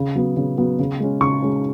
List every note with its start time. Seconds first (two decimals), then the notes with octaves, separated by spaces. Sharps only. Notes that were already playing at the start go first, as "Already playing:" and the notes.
Already playing: C#3
0.15 F#3 B3
0.37 C#3
0.58 F#3 B3
0.79 C#3
1.00 G#3 C#4
1.21 C#3 C#6
1.42 G#3 C#4